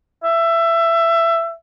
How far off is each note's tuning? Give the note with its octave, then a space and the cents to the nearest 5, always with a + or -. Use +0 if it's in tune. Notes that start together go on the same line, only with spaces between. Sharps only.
E5 +20